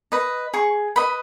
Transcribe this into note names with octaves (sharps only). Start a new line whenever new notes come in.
B4 D#5
G#4 C#6
B4 D#5 B5